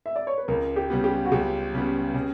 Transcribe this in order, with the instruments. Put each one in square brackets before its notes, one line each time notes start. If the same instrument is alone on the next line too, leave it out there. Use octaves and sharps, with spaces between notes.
[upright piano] E5
D5
C#5
B4
[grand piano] C#2 [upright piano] A#4
[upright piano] G4
[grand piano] C#3 G3 B3
[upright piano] G4
F#4
[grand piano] C#2 [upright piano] G4
[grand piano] C#3 G3 B3
C#3